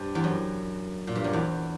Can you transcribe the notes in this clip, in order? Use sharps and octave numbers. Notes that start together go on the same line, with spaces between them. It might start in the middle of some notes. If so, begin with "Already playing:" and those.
Already playing: G2
E2
F#2
A#2
G2
F#2
E2